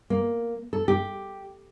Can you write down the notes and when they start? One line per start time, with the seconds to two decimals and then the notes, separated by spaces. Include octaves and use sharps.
0.10 A#3
0.73 A4
0.88 G4